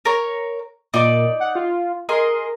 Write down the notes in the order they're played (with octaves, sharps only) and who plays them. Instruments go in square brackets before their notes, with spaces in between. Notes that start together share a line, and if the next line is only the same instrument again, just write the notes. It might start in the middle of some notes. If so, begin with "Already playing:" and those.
[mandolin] A#4 C#5
[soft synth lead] A#2 [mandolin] D#4 D5
[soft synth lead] F#5
F4
[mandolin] G#4 D#5 C6 [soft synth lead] A#4